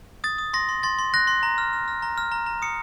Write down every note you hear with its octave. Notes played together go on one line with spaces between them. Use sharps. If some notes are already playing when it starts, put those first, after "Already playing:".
D#6 A6
D#6
C6 A#6
C6
C6 A6
C6
F#6 A#6
C6
A#5
F6
F6
F6
A#5
F6
A#5
A#5
D#6 C#7